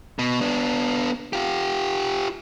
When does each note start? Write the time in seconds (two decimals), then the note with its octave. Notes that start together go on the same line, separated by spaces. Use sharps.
0.19 B2
0.41 B3 D4
1.33 F4 G4